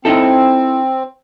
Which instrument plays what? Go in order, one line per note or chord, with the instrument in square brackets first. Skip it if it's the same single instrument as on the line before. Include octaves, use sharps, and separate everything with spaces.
[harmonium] C4 [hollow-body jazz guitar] D#4 E4 A4